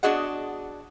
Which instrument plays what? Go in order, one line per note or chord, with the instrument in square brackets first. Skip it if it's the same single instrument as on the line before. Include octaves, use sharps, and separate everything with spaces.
[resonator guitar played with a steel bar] B3 D4 F#4 G#4 D#5 F#5